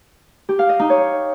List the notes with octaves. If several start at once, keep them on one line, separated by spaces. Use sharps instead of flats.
G4
F5
D#5
D#4
C#5